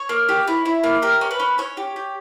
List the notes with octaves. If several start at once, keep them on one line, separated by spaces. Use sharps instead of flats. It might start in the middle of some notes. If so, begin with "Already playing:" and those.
Already playing: C#5
A#3
G4
E4
E4
A#3
G4 A#4
C#4
B4
C#4
C#4 C#5
G4
G4